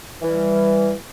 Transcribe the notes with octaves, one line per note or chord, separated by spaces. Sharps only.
E3 G3